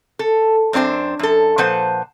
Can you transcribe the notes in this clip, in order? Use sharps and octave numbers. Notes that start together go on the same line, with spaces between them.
A4
F#2 C4 D4 F4 C5
F#2 A4
A#2 F3 B4 C5 F#5